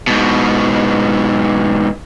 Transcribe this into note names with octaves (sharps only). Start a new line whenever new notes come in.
G#2 B2